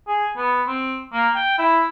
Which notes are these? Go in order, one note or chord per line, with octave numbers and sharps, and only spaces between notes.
G#4
B3
C4
A#3
G5
E4